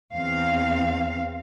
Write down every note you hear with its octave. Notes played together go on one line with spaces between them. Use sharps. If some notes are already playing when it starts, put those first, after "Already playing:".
E2 C4 F5